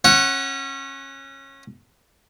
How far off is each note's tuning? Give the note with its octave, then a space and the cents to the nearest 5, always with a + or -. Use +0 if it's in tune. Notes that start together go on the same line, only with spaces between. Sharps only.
C#4 -25 F#5 +0